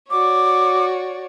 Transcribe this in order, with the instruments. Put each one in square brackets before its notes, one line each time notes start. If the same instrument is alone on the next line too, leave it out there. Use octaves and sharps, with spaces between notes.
[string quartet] F#4 C#5 D5 [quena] D6